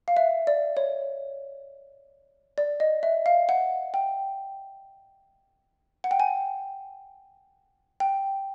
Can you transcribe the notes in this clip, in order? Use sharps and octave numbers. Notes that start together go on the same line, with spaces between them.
F5
E5
D5
C#5
D5
D#5
E5
F5
F#5
G5
F#5
G5
G#5
G5